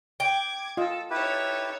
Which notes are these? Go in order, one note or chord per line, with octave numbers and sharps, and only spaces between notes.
G5 D6 G#6
F4 A4 D#5
D#4 E4 G4 A4 B4 C#5